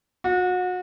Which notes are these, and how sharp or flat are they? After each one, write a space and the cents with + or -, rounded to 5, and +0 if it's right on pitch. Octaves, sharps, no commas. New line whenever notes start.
F#4 -30